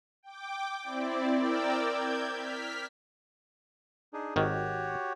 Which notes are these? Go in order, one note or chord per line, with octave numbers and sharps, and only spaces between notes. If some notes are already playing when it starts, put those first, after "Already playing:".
G5 D6
C4 E4 D5
A#4 D5 G5 D6 E6
G6 G#6
F6 B6
D4 D#4 G#4
G#1 D#3 F#4 G4 C#5